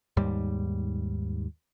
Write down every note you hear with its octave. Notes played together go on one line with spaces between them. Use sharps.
D#2 G#2 G3